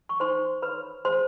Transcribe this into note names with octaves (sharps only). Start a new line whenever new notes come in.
C#6
D#4 C5 C6
B4 C#5 B5
G#4 C5 C6